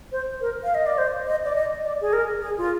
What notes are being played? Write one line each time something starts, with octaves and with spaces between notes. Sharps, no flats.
C5
A#4
F5
D#5
D5
C5
D#5
D5
D#5
D5
G#4
A#4
G#4
F4